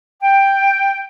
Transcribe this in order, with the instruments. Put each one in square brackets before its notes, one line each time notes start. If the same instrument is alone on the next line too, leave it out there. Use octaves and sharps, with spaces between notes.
[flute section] G5